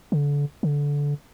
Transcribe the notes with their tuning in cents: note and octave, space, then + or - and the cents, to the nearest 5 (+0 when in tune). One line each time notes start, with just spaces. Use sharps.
D3 -30
D3 -20